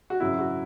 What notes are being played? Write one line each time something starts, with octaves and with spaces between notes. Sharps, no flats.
F#4
G#1 F#2 C#3 F#3 E4
F#4